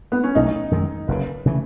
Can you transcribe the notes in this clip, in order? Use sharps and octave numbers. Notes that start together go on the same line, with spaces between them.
B3
C#4
B1 B2 A3 D#4
F#2 D#3 G#3
F#1 F#2 C#3 B4
C#3 E3 A3